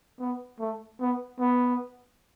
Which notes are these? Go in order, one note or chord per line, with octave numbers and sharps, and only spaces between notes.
B3
A3
B3
B3